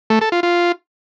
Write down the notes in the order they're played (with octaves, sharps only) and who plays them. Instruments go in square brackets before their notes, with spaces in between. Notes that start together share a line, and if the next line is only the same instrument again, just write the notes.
[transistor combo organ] A3
A4
F4
F4